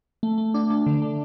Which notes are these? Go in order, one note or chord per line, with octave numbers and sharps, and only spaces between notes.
A3
A3
D4
A3
D3
A3